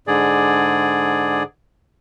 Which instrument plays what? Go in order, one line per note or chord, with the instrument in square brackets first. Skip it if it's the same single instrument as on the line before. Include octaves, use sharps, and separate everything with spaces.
[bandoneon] G#2 D3 G#4 D5